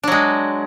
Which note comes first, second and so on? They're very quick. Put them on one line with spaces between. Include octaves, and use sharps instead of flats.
D4 F#3 G#3